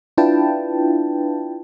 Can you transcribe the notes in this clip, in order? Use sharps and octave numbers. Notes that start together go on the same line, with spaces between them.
D4 E4 F4 B4 G5 A5